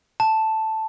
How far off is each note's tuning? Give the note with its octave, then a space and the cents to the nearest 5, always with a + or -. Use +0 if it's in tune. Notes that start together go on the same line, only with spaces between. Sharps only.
A5 +0